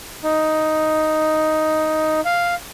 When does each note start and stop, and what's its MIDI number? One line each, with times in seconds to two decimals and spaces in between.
0.23 2.20 63
2.25 2.55 77